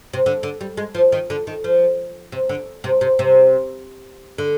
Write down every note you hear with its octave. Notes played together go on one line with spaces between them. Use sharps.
C3
D3
D3
G3
G#3
F3
D#3
D3
D#3
F3
C3
D3
C3
C3
C3
D3